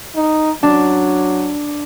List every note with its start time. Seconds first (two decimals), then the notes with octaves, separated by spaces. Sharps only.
0.15 D#4
0.63 F#3 D4